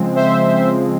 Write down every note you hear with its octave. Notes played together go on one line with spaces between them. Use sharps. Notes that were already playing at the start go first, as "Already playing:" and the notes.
Already playing: C#3 F3 G#3 C4
C5 E5